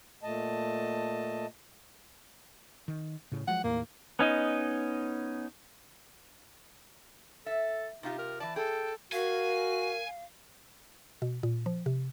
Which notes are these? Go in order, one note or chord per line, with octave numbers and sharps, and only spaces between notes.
A#2 A3 D#5 A5
D#3
A2 C#3
F3 F#3 G#3 F#5
D#2 A2 A#3
B3 C#4 D#4 D#5
A4 E5
C3 D#4 F4 G4
A#4
E3 D5 A5
G#4 A4 G5
F#4 A#4 F5 G#5
B2
A#2
F3
C3